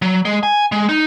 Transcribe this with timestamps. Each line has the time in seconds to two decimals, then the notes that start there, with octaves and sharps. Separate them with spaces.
0.02 F#3
0.25 G#3
0.43 G#5
0.72 G#3
0.89 D#4